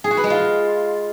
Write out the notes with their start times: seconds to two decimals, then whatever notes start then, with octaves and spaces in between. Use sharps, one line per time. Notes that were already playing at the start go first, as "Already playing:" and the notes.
0.04 G#4
0.11 F#4
0.17 B4
0.24 G#3
0.30 F4